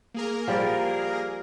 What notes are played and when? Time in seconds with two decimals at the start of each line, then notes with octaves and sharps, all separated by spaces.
0.14 A#3 G#4 A#4
0.47 F3 G3 D5